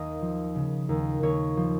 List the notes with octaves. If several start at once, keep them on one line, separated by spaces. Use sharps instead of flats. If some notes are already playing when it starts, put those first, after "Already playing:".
Already playing: D#2 D#5 F5
F3
C#3
D#2
D#2 C#5
F3